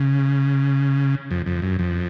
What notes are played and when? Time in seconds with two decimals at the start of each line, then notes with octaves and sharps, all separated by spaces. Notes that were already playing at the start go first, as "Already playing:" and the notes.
Already playing: C#3
1.31 F2
1.46 F2
1.62 F#2
1.79 F2